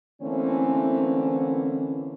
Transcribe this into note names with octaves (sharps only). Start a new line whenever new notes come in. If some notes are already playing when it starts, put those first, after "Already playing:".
D3 E3 A3 A#3 C4 C#4